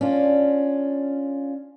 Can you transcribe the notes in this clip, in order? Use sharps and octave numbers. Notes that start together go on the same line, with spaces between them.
C#4 D4 F4